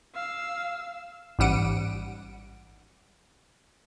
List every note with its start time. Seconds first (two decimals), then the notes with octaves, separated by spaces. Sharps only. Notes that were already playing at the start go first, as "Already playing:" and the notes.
0.15 F5 E6
1.39 A1 G#2 G3 F#5 D7 D#7